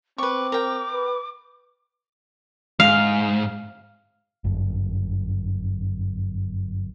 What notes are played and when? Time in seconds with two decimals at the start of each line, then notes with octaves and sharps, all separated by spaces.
0.18 C4 B4 C#6 D6
0.52 A#4 G5
0.92 B4
2.80 G#2 F5
4.44 G1 F#2